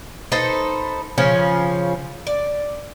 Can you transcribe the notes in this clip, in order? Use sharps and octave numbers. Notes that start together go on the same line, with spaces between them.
D#4 A4 B4 C5
C#3 F3 C#4
D5